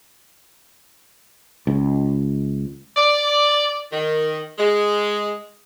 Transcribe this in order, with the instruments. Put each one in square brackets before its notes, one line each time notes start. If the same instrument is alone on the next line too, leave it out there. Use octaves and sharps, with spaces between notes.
[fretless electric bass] C#2
[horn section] D5
D#3
G#3